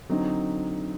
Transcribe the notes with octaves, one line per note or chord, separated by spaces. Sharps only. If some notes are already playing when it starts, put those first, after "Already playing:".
D3 F#3 C4 D#4